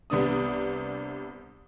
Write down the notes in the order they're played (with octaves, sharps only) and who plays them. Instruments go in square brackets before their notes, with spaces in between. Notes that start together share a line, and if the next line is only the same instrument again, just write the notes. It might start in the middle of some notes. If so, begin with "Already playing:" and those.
[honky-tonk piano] C2 C3 B3 D4 D#6